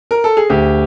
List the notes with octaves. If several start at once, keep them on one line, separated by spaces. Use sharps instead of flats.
A#4
A4
G#4
D2 G4